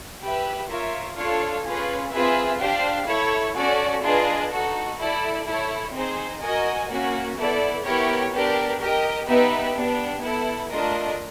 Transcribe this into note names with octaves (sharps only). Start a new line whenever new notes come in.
G4 B4 E5
F4 A#4 C#5 E5
D4 F4 A4 C#5 F5
C#4 F4 G#4 B4
C4 F4 G#4 B4 E5
D4 G4 C5 F5
E4 A4 C#5
C#4 F#4 A4 D5
D4 F4 G#4 B4 D#5
D#4 F#4 A4
E4 A4 D5
E4 A4 C#5
C4 D#4 G#4 C5
F#4 A#4 D#5 G#5
A#3 C#4 F#4
B3 E4 A4 D5
B3 E4 G4 A#4 C#5
B3 D4 G4 A#4
G4 A#4 D#5
B3 D#4 G4 B4 E5
B3 D4 G4
B3 E4 A4
A3 D4 F4 A#4 D#5